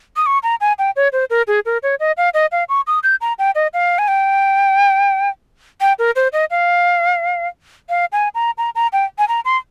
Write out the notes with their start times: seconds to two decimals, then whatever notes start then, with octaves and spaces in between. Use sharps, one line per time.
0.17 D#6
0.26 C#6
0.43 A#5
0.61 G#5
0.79 G5
0.96 C#5
1.13 C5
1.30 A#4
1.48 G#4
1.66 A#4
1.83 C#5
2.00 D#5
2.17 F5
2.34 D#5
2.52 F5
2.69 C#6
2.87 D#6
3.03 G6
3.21 A#5
3.39 G5
3.55 D#5
3.74 F5
3.99 G#5
4.08 G5
5.81 G5
5.99 A#4
6.16 C5
6.33 D#5
6.51 F5
7.89 F5
8.12 G#5
8.35 A#5
8.58 A#5
8.75 A#5
8.93 G5
9.19 G#5
9.28 A#5
9.45 C6